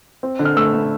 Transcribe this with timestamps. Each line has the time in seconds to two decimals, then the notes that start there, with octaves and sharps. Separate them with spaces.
0.23 C4
0.39 D3
0.45 F6
0.57 A3 E6
0.74 A3